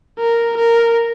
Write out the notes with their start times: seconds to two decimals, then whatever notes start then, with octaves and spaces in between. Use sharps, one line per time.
0.19 A#4
0.58 A#4